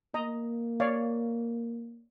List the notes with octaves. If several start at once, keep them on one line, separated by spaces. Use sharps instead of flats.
A#3 D#5 A#5
C#5 D5 F5